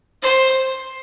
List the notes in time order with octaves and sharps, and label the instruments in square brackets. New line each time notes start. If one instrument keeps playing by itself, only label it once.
[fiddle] C5